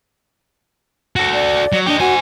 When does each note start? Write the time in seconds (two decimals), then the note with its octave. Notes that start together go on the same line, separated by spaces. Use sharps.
1.16 F#4 A4
1.33 D5
1.73 F#3
1.86 D4 G4 D#5
2.00 F#4 C5 G#5